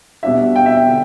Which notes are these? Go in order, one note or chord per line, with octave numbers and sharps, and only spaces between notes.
B2 G3 D4 E5
G5
E5
G5
D3